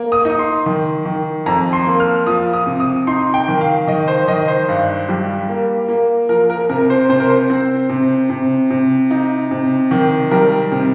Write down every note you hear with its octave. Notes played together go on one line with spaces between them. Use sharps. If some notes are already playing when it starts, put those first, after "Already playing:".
Already playing: A#3
D#6
D#4 D#6
C6
D#3
D#3
F2 A#5
C6
A#3
F6
F3 D#6
D#6
C3
D#6
D#4 C6
G5
D#3
F5
D#3 D#5
C5
D#3 D#5
C5
G2
G3
A#3
A#3
F3 A#4
A#4
C3 A#4
C5
C3 C5
A#4
C5
C4
C3
C3
C3
D#4
C3
D#3
G3 A#4
C3